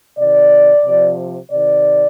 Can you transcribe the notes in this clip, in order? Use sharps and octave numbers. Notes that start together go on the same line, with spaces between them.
C3 D#3 D5
C3 F3
C3 D#3 D5